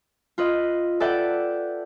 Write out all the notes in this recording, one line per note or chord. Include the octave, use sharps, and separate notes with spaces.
F4 B4 D#5
A4 B4 D5 E5 F#5 G5